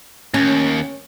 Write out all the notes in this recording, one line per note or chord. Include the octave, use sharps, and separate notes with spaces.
D#2 C#4